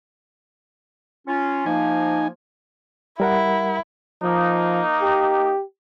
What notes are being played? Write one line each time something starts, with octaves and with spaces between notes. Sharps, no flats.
C#4 F4
F3 A#3 D#4 G#5
G3 E4 A#4 F#5
F3 A#3 D#4
G4